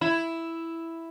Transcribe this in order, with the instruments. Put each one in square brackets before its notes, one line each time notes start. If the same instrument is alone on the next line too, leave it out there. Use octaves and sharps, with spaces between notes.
[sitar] E4